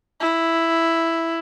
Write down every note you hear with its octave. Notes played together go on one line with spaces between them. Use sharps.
E4